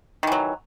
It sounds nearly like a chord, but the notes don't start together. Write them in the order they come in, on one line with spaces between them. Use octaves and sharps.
D#3 E3 F#3